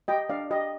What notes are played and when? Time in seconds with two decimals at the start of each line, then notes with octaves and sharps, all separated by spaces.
0.08 G4 D#5 G5
0.29 D4 D5 F5
0.51 G4 D#5